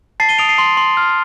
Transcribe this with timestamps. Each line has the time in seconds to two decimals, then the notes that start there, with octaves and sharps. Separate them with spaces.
0.20 A5 A6 C7
0.29 D#7 G7
0.38 D#6 D7 F7
0.49 C7 D#7
0.58 C6
0.77 C6
0.97 F6